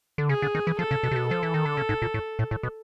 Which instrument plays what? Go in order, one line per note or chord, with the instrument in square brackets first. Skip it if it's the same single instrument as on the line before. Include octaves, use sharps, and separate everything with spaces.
[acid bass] D3
[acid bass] C#3 [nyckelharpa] G#4
[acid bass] D3
D#3
E3
[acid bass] F3 [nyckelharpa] A4
[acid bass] C#3
B2
C3
B2
[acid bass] F3 [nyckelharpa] A4
[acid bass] E3
D#3
D3
C#3
G#2
A#2
A2
A2
A2
B2